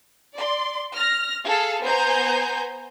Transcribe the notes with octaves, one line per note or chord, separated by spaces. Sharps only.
D5 C6
F6 A#6
G#4 A4 F5 A5
B3 C5 G#5 A#5 G6